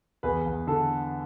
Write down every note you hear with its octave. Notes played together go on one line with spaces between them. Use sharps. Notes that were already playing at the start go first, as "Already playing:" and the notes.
E2 G#4 B4
E2
D3 A4